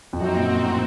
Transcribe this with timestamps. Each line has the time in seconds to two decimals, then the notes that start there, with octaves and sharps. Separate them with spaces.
0.13 F2
0.20 F#2 F3 C4 D#4 F#4
0.35 A#2
0.51 A#2
0.65 A2